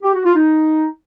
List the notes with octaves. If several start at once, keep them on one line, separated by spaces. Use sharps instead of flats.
G4
F#4
F4
D#4